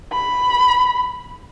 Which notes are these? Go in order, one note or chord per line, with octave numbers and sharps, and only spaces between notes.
B5